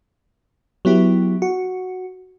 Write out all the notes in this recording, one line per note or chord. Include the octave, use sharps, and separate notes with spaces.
F#3 B3 E4 G4
F#4